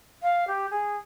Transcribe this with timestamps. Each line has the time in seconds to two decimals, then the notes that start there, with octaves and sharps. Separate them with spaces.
0.22 F5
0.47 G4
0.71 G#4